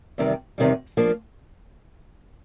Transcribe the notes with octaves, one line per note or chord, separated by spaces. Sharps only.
E2 C3 D#3 G3
E2 C3 D#3 G3
F3 A#3 D4